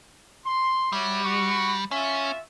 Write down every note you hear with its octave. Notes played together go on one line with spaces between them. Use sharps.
C6
G3 F#4 C#5 E5
F#4 C#6
C#4 F4 E5